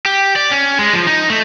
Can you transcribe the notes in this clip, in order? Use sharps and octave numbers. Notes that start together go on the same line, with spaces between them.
G4
D5
C#4
G#3
F3
D#4
A3